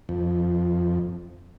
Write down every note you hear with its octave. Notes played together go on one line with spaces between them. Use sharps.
F2